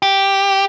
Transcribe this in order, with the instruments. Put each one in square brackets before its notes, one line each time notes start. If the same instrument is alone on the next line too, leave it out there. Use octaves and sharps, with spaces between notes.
[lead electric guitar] G4